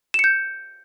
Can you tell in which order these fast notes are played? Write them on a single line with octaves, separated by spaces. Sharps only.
E7 C#7 G6